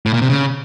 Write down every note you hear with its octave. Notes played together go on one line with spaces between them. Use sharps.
A2
A#2
C3
C#3